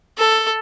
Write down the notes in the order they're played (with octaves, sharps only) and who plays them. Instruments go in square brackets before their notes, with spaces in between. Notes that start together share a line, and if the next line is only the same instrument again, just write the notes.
[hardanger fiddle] A4